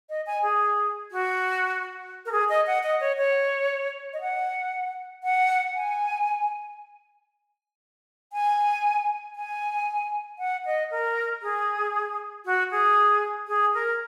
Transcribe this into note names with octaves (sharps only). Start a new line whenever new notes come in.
D#5
G#5
G#4
F#4
A#4
G#4
D#5
F#5
D#5
C#5
C#5
D#5
F#5
F#5
G#5
G#5
G#5
F#5
D#5
A#4
G#4
F#4
G#4
G#4
A#4